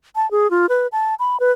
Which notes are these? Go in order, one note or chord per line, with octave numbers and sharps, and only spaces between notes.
A5
G#4
F4
B4
A5
B5
B4